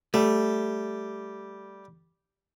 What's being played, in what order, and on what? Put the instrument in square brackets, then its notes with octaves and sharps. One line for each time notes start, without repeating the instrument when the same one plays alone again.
[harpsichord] G3 [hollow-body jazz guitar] A3